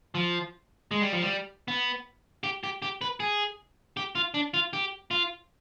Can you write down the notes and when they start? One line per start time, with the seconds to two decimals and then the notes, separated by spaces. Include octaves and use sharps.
0.15 F3
0.91 G#3
1.02 G3
1.12 F3
1.22 G3
1.68 B3
2.44 G4
2.63 G4
2.82 G4
3.01 B4
3.20 G#4
3.97 G4
4.15 F4
4.34 D4
4.54 F4
4.73 G4
5.11 F4